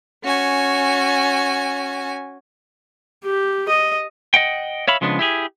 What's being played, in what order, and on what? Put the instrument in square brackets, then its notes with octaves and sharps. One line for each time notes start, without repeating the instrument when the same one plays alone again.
[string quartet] C#4 F#4 G#5
[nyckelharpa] G4
D#5
[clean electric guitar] D#5 F#5 G5
C#5 E5 F5 B5
C#3 F3 G#3 B3 C4 D4
E4 G4 G#4